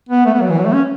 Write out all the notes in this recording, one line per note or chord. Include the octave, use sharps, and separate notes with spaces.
B3
A3
B3
F#3
E3
F#3
A3
C#4